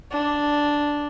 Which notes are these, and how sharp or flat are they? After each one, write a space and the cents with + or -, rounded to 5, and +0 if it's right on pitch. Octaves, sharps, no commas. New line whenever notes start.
D4 -5